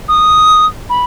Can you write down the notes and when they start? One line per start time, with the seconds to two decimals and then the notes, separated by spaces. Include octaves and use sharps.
0.09 D#6
0.90 B5